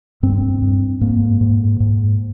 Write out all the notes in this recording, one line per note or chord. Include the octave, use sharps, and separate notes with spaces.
G2 C4
G2
G#2 A#3
G#2
G#2